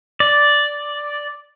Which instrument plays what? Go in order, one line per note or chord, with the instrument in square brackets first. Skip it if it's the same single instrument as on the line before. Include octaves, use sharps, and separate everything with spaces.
[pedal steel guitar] D5